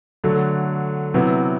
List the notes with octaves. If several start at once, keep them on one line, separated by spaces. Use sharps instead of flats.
D3 F#3 A3
C3 F#3 B3 E4